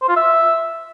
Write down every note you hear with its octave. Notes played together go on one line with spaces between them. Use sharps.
C5
F4
E5